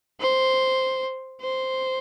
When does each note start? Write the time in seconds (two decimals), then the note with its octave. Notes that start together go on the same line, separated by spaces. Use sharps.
0.20 C5
1.41 C5